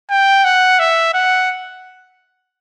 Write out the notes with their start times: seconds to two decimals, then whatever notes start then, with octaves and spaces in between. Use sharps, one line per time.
0.10 G5
0.45 F#5
0.79 E5
1.14 F#5